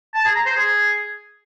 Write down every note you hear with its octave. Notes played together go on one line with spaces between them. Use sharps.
A5
G#4
A#5
C5
G#4